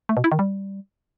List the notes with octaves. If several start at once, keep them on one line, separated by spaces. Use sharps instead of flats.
A3
B2
E4
D#3
G3